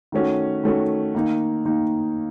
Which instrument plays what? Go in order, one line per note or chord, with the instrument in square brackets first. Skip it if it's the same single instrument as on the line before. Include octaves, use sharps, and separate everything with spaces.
[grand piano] D#3 A3 C#4 F#4
D#3 A3 C#4 F#4
D#3 A#3 D#4
D#3 A#3 D#4